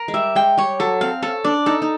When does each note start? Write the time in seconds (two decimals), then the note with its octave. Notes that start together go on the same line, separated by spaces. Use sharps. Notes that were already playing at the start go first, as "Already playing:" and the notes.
Already playing: A#4
0.08 G#3
0.14 G3 E5
0.36 G#3 G5
0.58 G3 C#5
0.80 F#3 A4
1.01 C4 F5
1.23 C#4 A4
1.44 D4 D5
1.66 D#4 A4
1.82 D#4